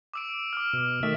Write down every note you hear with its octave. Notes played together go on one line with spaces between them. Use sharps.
D6 E6 D7
D6 F6
B2
D#3 A3 E5